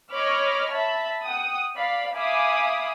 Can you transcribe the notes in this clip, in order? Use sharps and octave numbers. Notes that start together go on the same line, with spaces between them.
C#5 D#5 B5 D6 F6
E5 A5 B5
F#5 G5 D#6
D5 F5 B5
E5 F5 G#5 B5 D6 D#6